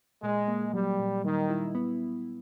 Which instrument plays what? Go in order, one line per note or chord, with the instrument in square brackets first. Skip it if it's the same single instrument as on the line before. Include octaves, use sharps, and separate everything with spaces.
[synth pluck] A#2 [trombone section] G#3
[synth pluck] A#3
[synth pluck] F#3 [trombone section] G3
[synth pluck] A#2
[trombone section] D#3 [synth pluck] G3
[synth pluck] E4
B3